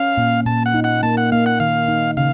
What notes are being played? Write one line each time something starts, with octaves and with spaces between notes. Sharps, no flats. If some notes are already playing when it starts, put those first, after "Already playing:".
Already playing: C#4 F5
A#2
A#2 A5
F#5
D#4
F#5
A#3 A5
F#5
A#3 F5
F#5
D#3 F5
D#4
C#3 F5